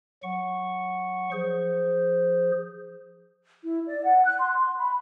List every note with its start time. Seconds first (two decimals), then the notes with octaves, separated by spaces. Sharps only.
0.23 F#3 F#5 C#6
1.32 F3 G#4 C5
3.63 E4
3.87 D5
4.05 F#5
4.24 F#6
4.39 C6
4.54 C6
4.77 B5